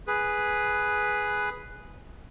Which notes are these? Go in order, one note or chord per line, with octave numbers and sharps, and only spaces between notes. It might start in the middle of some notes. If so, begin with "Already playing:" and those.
G#4 B4